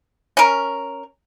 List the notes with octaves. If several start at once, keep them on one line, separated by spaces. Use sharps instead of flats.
C#4 A#4